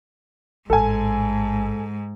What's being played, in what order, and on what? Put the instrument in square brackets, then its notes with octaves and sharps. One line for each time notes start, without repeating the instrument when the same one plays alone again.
[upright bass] A1 [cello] G#2 [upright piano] A4 G#5